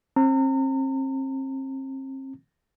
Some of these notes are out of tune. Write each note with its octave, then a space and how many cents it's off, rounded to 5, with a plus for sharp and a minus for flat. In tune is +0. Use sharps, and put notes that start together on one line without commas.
C4 +40 A#5 -40